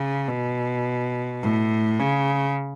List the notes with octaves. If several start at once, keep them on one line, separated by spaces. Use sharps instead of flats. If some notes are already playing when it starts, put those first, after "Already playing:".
Already playing: C#3
B2
A2
C#3